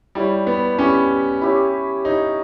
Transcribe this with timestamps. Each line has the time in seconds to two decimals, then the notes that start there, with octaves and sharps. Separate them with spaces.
0.15 G3 E4 G4 C#5
0.47 B3
0.79 C#4 E4 G4 C#5
1.42 E4 G4 C#5
2.04 D#4 E4 G4 C#5